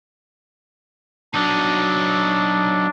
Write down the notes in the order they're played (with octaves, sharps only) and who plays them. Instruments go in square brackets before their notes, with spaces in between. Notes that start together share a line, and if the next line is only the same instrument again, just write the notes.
[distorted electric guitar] F#3 D#4 [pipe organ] D4